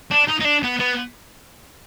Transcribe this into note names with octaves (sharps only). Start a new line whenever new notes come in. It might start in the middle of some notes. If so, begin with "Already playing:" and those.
D4
D#4
D#4
D4
B3
B3